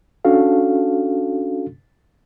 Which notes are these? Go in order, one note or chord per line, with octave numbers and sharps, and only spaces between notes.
C#4 D4 F#4 A4 F5